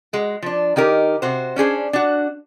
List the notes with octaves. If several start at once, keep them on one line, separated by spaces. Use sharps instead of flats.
G#3 F#4
F3 D4
D#3 D#4 G4 A#4
C3 F#4 C5
C#4 D4 G#4 C5
D4 F#4